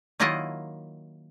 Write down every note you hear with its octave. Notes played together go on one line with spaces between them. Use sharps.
D#3 F#3 A#3 E4 F4 D#5